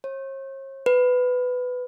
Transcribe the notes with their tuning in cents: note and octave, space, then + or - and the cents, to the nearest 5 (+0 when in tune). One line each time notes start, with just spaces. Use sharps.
C#5 -45
B4 +15